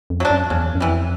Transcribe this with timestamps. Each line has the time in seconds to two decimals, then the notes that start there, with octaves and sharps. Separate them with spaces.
0.10 F2
0.20 F#3 A3 D4
0.30 F#2
0.50 E2 C#3
0.75 F#2
0.80 F2 E3 G3